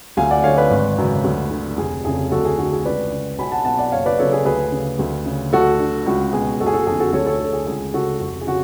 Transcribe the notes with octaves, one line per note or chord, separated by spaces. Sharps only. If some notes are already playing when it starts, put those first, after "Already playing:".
D2 F5 G#5
D5 F#5
D3 C#5 F5
B4 D5
G#1
F#2 C#3
D2
D3
F1 G#4
F2 C#3 G#4
D2 F#4 A4
G#4
D3 F#4
G#4
C#2 B4 D5
C#3
B1 G#5 B5
F#5 A5
B2 F#5 A5
D5 F#5
F#1 C#5 F5
B4 D5
F#2 C#3 A4 C#5
G#4 B4
D2 G#4 B4
C#3
D2
C#3
D2 F#4 A4
D3
C#2 F#4
B2 G#4
F#1 F#4 A4
G#4
F#4 A4
F2 D3 G#4
F#4 A4
D2 A4 C#5
A4 C#5
D3
G#4
C#2 G#4
C#3 F#4 A4
F1 F#4
G#4
C#3 F#4